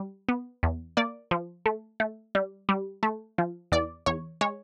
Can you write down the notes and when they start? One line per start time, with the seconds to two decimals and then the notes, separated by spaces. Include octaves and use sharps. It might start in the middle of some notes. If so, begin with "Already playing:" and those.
Already playing: G3
0.29 B3
0.63 E2
0.97 A#3 D5
1.31 F3
1.66 A3
2.00 A3
2.35 G3
2.69 G3
3.03 A3
3.38 F3
3.72 E2 D5
4.06 E2 C#5
4.41 G#3 C#5